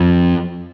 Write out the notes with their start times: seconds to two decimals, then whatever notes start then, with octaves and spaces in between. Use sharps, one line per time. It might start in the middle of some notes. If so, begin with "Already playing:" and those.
Already playing: F2